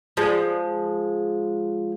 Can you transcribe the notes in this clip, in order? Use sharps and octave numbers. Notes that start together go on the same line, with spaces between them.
F3 G#3